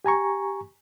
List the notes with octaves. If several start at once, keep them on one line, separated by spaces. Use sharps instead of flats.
G4 G#5 A#5 C#6